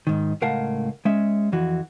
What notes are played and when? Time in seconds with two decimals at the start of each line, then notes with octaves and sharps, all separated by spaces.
0.07 G#2 D#3
0.42 C#2 A2 A#4 F5 F#5 A5
1.05 G#3 C#4 E5
1.52 F2 E3 F#4